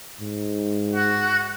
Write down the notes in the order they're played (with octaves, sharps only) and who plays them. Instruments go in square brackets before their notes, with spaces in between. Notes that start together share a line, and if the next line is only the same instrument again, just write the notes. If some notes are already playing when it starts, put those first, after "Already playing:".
[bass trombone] G#2
[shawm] F#4